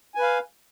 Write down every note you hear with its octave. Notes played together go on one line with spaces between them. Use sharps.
B4 F5 G#5